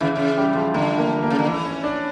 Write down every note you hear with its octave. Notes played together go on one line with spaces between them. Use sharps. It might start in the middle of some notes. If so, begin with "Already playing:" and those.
C#3 E3 E4
C#3
G3 G4
F3 F4
D3 A3 A4
A#3 A#4
A#3 A#4
C#3
D3
E3
C#4 C#5
D4 D5